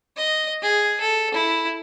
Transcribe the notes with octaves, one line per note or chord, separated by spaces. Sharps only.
D#5
G#4
A4
E4